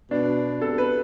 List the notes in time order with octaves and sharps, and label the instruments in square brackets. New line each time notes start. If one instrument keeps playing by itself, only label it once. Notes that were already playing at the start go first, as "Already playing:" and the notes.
[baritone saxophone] B2 [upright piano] D4
[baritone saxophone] C3 [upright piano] A4
[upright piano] B4